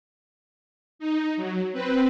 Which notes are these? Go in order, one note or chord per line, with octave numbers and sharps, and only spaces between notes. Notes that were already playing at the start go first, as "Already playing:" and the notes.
D#4
F#3
C4 B4